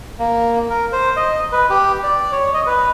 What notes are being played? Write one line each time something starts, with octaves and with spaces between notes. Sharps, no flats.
A#3
A#4
C5
D#5
B4
G4
D5
C#5
D#5
B4